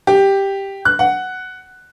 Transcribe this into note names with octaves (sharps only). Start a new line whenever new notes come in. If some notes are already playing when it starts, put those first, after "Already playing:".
G4
F#6
F#5